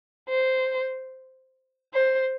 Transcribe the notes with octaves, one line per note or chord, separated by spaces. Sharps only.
C5
C5